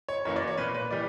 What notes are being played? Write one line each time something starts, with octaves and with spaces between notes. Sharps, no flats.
C#5
F#2 E3 A#3 C#5
D5
C#5
A#2 A#3 B4
B4
E3 G3 D5